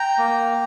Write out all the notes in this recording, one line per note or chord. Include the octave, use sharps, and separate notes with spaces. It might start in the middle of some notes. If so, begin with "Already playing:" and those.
Already playing: G5 A#5
A#3